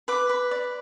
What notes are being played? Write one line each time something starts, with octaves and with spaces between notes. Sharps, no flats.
B4 D6
B4
D5